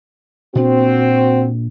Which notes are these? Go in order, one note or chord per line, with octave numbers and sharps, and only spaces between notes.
A#2 C4 D4 F#4